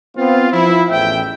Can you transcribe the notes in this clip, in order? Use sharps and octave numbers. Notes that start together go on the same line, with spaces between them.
B3 C4 F4
F3 E4
A1 E2 E5 G5